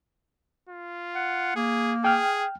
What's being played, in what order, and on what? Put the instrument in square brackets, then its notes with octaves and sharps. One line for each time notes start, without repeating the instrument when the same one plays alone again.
[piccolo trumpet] F4
[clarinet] F#5
[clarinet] A#3 [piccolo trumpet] G#4
[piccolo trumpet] G#4 [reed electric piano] G5 F6